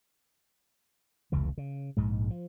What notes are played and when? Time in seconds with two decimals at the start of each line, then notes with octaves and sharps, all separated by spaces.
1.32 F1 C#2 C#3 E3
1.58 C#3
1.97 A#1 G#2 G#3
2.30 F3